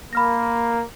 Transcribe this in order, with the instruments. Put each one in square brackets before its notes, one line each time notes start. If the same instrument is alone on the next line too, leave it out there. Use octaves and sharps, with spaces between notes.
[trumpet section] A#3 [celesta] B5 F6 A#6